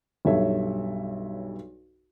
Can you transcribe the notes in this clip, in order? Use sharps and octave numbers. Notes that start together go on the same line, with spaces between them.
B1 G2 A4 C#5 E5